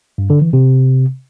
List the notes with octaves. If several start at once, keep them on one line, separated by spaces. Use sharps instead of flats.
G2
D3
E3
C3